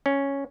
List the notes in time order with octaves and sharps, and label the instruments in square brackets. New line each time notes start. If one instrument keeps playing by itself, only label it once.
[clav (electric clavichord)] C#4